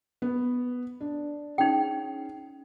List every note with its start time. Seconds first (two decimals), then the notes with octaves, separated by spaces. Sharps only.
0.22 B3
1.01 D4
1.58 C#4 D#4 G#4 G5